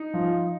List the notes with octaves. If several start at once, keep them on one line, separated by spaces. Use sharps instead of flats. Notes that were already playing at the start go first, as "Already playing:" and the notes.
Already playing: D#4
F3